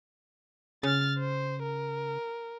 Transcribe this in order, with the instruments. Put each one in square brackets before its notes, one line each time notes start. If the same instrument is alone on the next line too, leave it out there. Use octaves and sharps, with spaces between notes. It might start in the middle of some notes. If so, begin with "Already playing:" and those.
[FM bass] C#3 [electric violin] F6 A6
[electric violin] C5
A#4